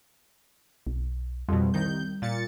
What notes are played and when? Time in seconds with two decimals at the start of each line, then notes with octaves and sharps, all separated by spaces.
0.87 B1
1.49 F2 B2 G3
1.74 C2 D#3 G6
2.22 A#2 A6 C#7